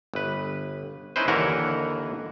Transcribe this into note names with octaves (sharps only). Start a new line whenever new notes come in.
G1 B4
C#4 D#4 E4 B4 C5
D#2 D3 E3 A#4 C#5 F#5